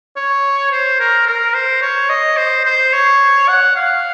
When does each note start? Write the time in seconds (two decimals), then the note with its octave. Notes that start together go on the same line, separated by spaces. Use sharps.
0.16 C#5
0.71 C5
1.00 A#4
1.27 A#4
1.54 C5
1.82 C#5
2.09 D#5
2.37 C5
2.65 C5
2.93 C#5
3.48 F#5
3.76 F5